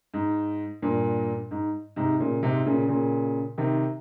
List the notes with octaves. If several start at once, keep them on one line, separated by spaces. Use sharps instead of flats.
G#2
G2 A#2
G#2
G#2 C3
A#2 C#3
G#2 C3
A#2 C#3
A#2 C#3
C3 D#3